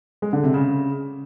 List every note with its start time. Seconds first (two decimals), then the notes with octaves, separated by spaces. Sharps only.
0.22 G#3
0.33 D3
0.43 C3
0.54 C#3